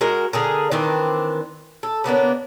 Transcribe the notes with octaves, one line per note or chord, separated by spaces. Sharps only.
G#3 F#4 A#4
D3 G#4 A#4
D#3 E3 C4 D4
A4
C#3 A#3 B3 D4